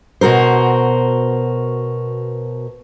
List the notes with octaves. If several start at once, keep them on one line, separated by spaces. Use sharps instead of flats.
B2 F#4 A#4 C5